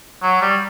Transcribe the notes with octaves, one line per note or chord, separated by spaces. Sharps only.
F#3
G3